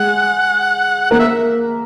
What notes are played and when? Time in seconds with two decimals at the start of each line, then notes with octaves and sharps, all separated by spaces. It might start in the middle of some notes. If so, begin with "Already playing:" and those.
Already playing: G#3 G#4 F#5
1.11 A#3 A#4 F#5
1.19 E5